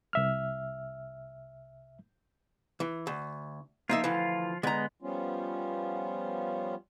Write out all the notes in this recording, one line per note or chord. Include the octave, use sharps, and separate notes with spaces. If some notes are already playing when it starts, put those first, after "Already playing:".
C2 E5 F6
E3
D2
F3 A#3 D#4 F4 E5
D2 E3
D3 G#3 B3 A#5
F3 G3 B3 C#4 F4